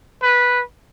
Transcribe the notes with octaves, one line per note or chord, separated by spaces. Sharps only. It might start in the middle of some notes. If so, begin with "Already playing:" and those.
B4